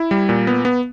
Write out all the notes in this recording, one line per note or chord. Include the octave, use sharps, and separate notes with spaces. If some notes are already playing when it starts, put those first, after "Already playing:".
Already playing: E4
G3
A#2
B3
B3